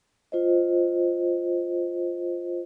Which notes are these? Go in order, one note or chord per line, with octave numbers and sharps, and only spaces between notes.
F4 C5 D#5